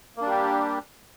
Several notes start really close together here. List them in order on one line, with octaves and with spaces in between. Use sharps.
A#3 D4 G3 G4